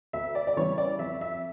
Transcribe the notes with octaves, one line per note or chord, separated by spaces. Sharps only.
D2 E5
D5
D5
C#3 E3 G3 C#5
D5
F2 E5
E5